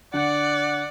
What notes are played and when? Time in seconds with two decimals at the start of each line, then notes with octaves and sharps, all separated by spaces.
0.14 D3 D5 F#5